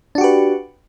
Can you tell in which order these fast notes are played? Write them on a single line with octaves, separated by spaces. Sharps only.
D4 F#4 G4 B4